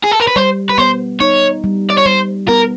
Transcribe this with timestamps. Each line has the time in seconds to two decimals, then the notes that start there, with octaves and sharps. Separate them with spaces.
0.04 G#4
0.12 A4
0.20 A#4
0.27 B4
0.36 G3 C5
0.69 B4
0.78 B3 C5
1.20 D#4 C#5
1.64 G3
1.90 D5
1.98 C#5
2.06 G3 C5
2.48 B3 A#4